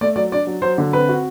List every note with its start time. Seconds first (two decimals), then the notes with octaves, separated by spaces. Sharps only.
0.01 A3 D5
0.16 F#3 D5
0.32 D4 D5
0.47 F#3
0.62 F#3 C5
0.78 D3
0.93 C4 B4
1.09 F#4